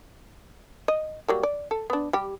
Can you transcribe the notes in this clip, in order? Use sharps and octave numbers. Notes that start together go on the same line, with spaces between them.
D#5
F#3 G3 A#3
D5
A4
B3 D4
G3 G4